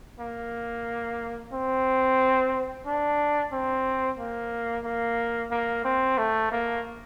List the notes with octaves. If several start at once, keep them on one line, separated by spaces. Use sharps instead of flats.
A#3
C4
D4
C4
A#3
A#3
A#3
C4
A3
A#3